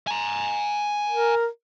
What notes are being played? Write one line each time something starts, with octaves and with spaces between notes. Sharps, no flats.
G#5 A#5
A#4